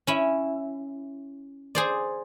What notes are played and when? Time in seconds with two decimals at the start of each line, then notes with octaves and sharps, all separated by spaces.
0.07 C#4 E4
1.75 G#4 C5 D5